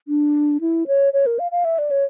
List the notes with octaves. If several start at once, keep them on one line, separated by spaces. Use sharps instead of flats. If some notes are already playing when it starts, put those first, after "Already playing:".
D4
E4
C#5
C#5
A#4
F5
F5
E5
D5
C#5